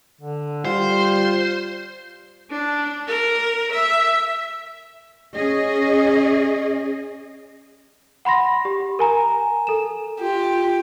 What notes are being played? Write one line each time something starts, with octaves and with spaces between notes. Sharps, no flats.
D3
G3 F4 C5
D4
A#4
E5
C#4 G#4 D#5
F#5 B5 C6 A#6
G4
A#4 G#5 A#5
A4 E7
F4 G4